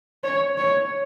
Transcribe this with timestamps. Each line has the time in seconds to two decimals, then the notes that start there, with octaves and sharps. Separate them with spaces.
0.24 C#5
0.58 C#5